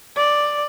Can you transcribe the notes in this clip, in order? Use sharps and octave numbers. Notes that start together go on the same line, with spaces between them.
D5